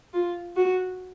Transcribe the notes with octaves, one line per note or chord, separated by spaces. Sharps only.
F4
F#4